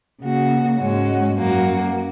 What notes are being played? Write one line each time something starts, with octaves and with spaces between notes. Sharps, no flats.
C#3 A#3 F#4
G#2 G#3 C#4 F#4
F#2 F#3 A#3 F#4